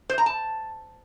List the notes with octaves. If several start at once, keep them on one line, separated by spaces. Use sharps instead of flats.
C5
A#5
A5